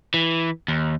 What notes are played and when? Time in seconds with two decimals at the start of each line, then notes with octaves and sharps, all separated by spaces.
0.14 E3
0.68 D#2